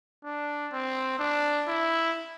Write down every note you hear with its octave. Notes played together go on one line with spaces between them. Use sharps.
D4
C4
D4
E4